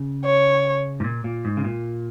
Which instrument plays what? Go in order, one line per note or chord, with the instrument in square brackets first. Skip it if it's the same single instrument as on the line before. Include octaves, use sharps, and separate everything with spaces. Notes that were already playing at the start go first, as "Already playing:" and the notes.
Already playing: [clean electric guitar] C#3
[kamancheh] C#5
[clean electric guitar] G#2
A#2
A#2
G#2
C#3
A#2